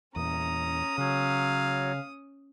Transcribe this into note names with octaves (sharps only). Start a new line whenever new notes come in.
E2 A#2 C#4 A#5 D#6
C#3 F#3 F5